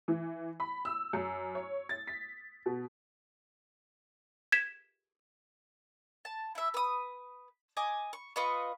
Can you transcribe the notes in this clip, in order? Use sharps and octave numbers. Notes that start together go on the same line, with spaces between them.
E3
B5
E6
F#2
C#5
A6
B6
B2
G#6 B6 E7
A5
E4 E5
B4 D#6
D#5 G#5 D6
C#6
F4 B4 D#5 C#6